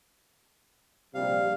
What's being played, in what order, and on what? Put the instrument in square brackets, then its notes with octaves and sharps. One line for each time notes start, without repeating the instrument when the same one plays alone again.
[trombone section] A#1 C3 G3 [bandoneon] F5